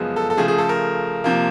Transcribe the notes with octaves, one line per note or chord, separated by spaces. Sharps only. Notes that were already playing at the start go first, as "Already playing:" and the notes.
Already playing: F#2 C#3 F3 G#3 B3
A4
A4
C#3 F3 A3 G#4
G#4
A4
A#4
C3 F3 A#3